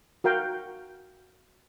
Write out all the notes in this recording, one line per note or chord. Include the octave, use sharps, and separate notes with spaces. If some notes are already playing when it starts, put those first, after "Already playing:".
F#4 A#4 F5 G5